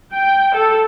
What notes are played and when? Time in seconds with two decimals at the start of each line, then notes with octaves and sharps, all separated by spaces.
0.14 G5
0.56 A4